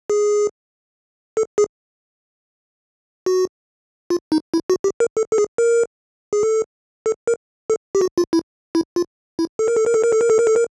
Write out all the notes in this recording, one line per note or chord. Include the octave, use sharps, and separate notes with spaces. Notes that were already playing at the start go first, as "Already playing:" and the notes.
G#4
A4
G#4
F#4
F4
D#4
E4
F#4
G4
A#4
A4
A4
G#4
A#4
G#4
A4
A4
A#4
A4
G4
F#4
F4
E4
E4
F4
E4
A4
A#4
A4
A#4
A4
A#4
A4
A#4
A4
A#4
A4
A#4